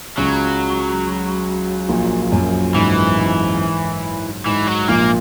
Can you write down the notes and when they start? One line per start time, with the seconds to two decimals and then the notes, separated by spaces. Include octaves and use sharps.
0.17 C#2 C#3 F#3
1.89 A#1 A#2
2.32 F#2
2.74 G#2 E3
3.18 G#2
4.46 G#2 E3
4.68 F#3
4.89 A#1 A#2 A#3